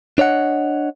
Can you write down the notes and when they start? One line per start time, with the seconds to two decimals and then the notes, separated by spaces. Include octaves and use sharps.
0.18 D4 C#5 D#5 F#5